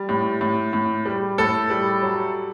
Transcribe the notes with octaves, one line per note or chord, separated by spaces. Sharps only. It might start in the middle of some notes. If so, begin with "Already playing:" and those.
Already playing: G3
A2
A2
A2
G3
A2 A4
G3
F#3